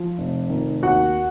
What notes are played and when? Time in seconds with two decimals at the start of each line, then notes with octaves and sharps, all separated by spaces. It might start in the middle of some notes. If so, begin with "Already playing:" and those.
Already playing: F3
0.18 F1
0.50 D#3
0.83 D#2 F#4 F#5